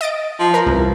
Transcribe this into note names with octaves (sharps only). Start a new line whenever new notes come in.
D#5 A6 D7
F3
A#4
C2 E3